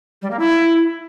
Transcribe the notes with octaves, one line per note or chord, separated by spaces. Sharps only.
G3
A#3
E4